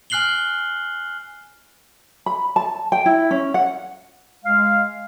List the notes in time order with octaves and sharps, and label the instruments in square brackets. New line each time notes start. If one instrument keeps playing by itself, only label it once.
[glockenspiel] G#5 F6 F#6 C7 F#7 G7
[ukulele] B5
A5
G5
E4
C#4
F#5
[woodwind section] G#3 F5